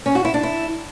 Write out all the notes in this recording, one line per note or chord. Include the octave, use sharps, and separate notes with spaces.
C#4
F#4
E4
D4
E4